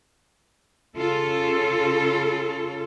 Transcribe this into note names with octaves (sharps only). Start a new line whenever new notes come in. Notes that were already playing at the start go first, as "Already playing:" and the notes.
C#3 F4 A4